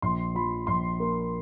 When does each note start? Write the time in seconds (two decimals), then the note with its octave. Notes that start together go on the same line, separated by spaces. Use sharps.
0.02 A#1 C6
0.35 F3 B5
0.67 A#1 C6
1.00 A#3